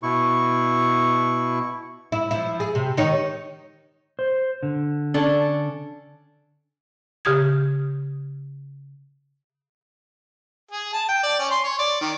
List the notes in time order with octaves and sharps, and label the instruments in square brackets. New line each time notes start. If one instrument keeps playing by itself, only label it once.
[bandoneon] B2 E4 C#6
[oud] E4
F3 E4
G#4
C3
D#3 D#4 C#5
[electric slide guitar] C5
D3
[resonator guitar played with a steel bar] C#4 D4 A4
[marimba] C#3 G4 D#6 G#6
[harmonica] G#4
A5
G5
D5
C#4
C6
C#5
D5
D#3